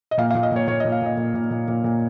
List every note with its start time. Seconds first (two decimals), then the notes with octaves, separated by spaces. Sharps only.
0.11 D#5
0.18 A#2 F5
0.31 F5
0.35 A#2
0.43 D#5
0.52 A#2 C#5
0.67 A#2 C#5
0.80 D#5
0.85 A#2
0.92 F5
1.02 A#2 D#5
1.17 A#2
1.34 A#2
1.51 A#2
1.68 A#2
1.84 A#2